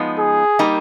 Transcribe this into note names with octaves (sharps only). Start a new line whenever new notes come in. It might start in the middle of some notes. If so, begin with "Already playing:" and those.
Already playing: F3 G#3 B3 D#4
G#4
G3 A#3 D#4